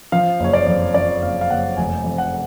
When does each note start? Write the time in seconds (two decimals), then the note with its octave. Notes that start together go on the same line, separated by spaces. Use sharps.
0.12 F3 F5
0.40 F#1 C#5
0.53 D5
0.67 F2
0.94 F3 D5
1.22 F#1 F5
1.41 F5
1.50 F#1 F#5
1.77 F1 G#5
2.04 F2
2.18 F#5